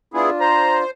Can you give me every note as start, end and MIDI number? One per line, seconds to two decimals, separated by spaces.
0.14 0.30 59
0.14 0.84 62
0.14 0.30 64
0.14 0.84 65
0.14 0.30 68
0.41 0.91 72
0.41 0.77 82